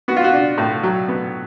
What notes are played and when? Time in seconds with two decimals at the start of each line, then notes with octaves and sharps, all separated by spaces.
0.08 B3 F#4
0.17 F4
0.24 F#4
0.33 D4
0.58 A2
0.83 F#3
1.09 B3